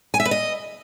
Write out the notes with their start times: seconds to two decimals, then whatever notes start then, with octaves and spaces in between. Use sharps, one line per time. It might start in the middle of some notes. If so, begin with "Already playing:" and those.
0.14 G#5
0.20 E5
0.25 B4
0.31 D#5